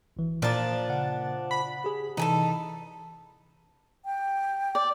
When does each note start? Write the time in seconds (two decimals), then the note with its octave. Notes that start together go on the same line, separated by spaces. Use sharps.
0.17 G#1 E3
0.42 A#2 F3 D4 D5 A#5 A6
0.88 C#3 F#5
1.51 B5
1.84 G4 G#4
2.17 C3 E3 D#4 G#4 A4
4.05 G5
4.75 D5